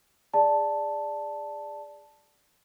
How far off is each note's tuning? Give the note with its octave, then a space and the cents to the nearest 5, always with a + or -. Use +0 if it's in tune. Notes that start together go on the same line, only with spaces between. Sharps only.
G#4 -20 D5 +0 A5 +0